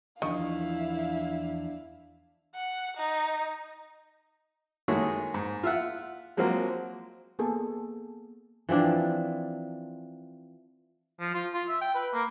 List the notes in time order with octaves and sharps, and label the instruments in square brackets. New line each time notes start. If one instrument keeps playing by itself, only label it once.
[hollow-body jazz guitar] E2 F3 D#5 [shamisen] D#3 [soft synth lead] D4 [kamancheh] E4 F5
[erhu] F#5
D#4
[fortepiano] D#3 G#3 A3 F#4 G#4 C#5
G#2
F4 E5 F#5
F3 F#3 G#3 A#3 C4 F#4
[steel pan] A#3 B3 G#4 A4
[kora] E3 F3 C4 D4
[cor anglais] F3
F4
F4
E5
G5
B4
A#3